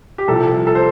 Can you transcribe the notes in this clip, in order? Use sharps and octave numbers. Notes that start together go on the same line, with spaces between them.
G4
C2 C3 F3 A4
A4
C5